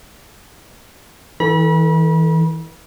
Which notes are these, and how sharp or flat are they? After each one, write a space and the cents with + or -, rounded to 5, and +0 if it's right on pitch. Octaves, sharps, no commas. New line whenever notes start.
E3 -30 A4 +0 B5 -35